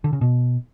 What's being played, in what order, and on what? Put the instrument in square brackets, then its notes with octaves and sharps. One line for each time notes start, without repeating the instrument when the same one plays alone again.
[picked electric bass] D3
C#3
B2